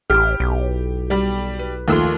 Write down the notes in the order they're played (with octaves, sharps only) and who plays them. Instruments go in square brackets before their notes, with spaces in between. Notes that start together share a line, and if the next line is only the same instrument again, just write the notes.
[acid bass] A1 [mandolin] E4 F6 [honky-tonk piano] G4
[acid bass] B1
[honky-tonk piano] G3
[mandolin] B4
[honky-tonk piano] D#2 F3 A3 [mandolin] C6 E6 F#6